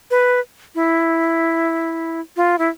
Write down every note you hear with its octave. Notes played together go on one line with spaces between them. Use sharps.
B4
E4
F4
E4